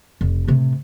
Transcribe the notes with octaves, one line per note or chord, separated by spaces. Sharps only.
F1
A2 C3